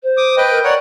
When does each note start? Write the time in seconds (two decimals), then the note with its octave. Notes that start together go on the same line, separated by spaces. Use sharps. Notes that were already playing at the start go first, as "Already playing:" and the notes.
0.03 C5
0.17 D6 D#6
0.37 B4 D#5 G5
0.50 A#4
0.64 A#4 C#5 D5 F#5